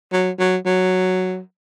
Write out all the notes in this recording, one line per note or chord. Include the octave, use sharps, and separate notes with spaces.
F#3
F#3
F#3